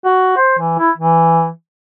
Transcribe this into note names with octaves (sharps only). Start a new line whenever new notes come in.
F#4
C5
E3
E4
E3